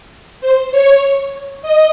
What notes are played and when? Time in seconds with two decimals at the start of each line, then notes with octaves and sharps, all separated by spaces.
0.41 C5
0.71 C#5
1.62 D#5